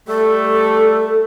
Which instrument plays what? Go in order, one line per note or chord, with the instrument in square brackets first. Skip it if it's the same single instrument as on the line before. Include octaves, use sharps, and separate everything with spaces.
[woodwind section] G3 A3 [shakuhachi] A4